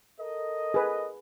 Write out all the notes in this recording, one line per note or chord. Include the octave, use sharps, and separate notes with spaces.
A4 A#4 D#5
G#4 B4